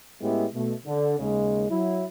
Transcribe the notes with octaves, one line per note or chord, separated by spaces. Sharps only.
A2 G#3 B3 C#4 E4 G4
B2 A3
D3
D#2 C#3 G#3
F#3 E4